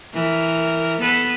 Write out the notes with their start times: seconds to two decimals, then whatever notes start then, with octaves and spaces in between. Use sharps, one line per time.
0.14 E3 A#4
1.01 B3 A4 B4